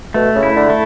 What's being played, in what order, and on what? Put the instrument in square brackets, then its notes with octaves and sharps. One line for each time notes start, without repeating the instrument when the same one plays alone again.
[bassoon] B2 [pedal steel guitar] A3
[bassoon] C#3
[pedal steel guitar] E4
[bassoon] D3
[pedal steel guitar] A3